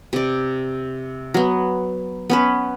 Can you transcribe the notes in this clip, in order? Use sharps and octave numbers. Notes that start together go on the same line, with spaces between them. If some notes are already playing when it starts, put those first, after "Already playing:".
C3 D5
F#3 B3
B3 C#4 B4